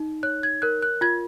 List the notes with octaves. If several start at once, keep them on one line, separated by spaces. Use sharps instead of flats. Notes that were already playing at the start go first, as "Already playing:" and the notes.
Already playing: D#4
C#5 F#6
G#6
A#4 F#6
F#6
F4 G#6